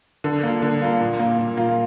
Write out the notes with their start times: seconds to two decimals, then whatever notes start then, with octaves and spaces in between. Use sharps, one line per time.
0.24 D3
0.43 A#3 F4
0.62 D3
0.82 A#3 F4
1.00 A#2
1.19 A#3 F4
1.38 A#2
1.57 A#3 F4